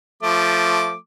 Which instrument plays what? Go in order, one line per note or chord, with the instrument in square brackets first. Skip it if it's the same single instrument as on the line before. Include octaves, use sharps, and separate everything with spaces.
[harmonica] F3 A3 D6